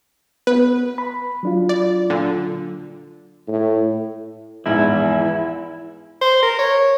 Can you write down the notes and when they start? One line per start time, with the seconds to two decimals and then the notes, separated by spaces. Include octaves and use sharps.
0.47 B3 B4
0.98 B5
1.43 F#3 D4 F4
1.69 D5
2.10 A#2 D3
3.48 A2
4.66 A#1 E2 G#2 E4
6.21 C5
6.43 A#4
6.59 C#5